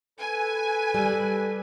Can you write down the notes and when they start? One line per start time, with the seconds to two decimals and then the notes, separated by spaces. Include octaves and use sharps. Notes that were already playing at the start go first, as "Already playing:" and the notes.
0.20 A4 B4 G#5
0.94 G3